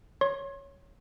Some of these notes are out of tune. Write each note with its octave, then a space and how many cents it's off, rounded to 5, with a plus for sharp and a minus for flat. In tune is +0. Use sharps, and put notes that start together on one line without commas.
C#5 +0 C6 +40